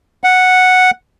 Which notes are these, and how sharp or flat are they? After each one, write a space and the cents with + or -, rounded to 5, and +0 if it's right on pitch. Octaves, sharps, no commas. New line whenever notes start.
F#5 -5